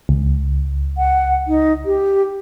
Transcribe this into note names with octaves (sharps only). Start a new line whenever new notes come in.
C#2
F#5
D#4
G4